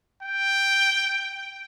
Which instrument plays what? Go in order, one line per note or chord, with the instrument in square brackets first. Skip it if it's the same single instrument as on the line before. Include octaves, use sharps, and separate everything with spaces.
[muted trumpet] G5